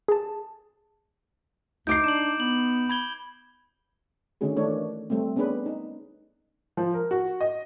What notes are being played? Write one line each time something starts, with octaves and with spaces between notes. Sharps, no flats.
G#4 A5
D2 D#4 D6 G6 C7 D7
D4 E7 F#7
B3 F#7
B5 G#6 G7
D3 D#3 A3 C#4 F#4 G#4
D#3 E3 A3 D4 C#5
G3 A3 C4
B3 C#4 D4 G#4 B4
D#4
F3
A#4
F#4
D#5